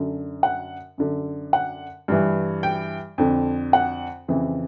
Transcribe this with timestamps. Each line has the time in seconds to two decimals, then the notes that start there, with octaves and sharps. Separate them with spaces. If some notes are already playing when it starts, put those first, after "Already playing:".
Already playing: F#2 D3
0.43 F#5
0.98 F#2 D3
1.53 F#5
2.08 G2 E3
2.63 G5
3.18 F2 D3
3.73 F#5
4.28 F2 C#3 E3